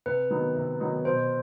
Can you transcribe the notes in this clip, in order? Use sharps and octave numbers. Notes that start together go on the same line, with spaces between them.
C3 B4
D#3 F#3 B3 D#4
C3
D#3 F#3 B3 D#4
B2 C5